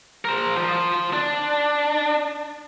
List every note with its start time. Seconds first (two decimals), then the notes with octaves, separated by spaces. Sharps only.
0.25 A#4 C5
0.56 F3 C5
1.13 D4